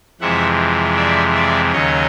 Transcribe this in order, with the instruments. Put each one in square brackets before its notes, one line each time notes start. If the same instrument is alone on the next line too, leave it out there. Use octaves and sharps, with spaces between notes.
[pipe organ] F2 C3 E3 G#3 E5 F#5
D5 E5
D5 E5
D#2 C#3 F#3 C#5 D#5